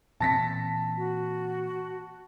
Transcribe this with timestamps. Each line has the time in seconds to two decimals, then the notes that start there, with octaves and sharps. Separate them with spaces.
0.20 A#2 E3 C4 A5 A#6 B6
0.97 F#4